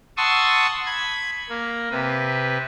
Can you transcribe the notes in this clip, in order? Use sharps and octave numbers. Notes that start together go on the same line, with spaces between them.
F#5 A5 C6 C#6 D#6 E6
B5 G#6
A#3
C3 B4